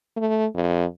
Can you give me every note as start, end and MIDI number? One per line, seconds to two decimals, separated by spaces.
0.17 0.46 57
0.55 0.85 41